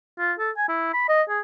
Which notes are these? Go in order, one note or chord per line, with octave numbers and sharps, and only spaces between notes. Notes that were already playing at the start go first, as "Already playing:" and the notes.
F4
A4
G#5
E4
B5
D#5
G#4